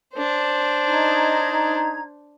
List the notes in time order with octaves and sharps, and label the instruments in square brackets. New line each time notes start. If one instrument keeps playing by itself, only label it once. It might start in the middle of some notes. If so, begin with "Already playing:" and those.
[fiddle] D4 C5
[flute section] D#4 A#5 G#6